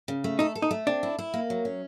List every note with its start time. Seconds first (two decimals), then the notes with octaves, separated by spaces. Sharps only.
0.08 C#3
0.24 A3
0.39 D#4 A4
0.55 A4
0.62 D#4
0.71 A3
0.87 C4 D4
1.03 E4
1.19 E4
1.34 A#3
1.50 F#3
1.65 C#4